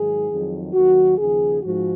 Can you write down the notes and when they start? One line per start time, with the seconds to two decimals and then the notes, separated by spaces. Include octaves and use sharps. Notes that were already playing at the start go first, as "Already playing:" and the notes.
Already playing: G#2 D#3 F#3 G#4
0.28 F2 D#3 F#3
0.73 D#2 D#3 F#3 F#4
1.18 D#2 C#3 F3 G#4
1.63 G#2 F3 F#4